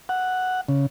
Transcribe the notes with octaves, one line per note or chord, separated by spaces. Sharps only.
F#5
C#3